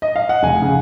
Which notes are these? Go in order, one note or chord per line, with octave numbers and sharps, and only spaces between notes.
D#5
F5
F#5
F1 G#5
C#3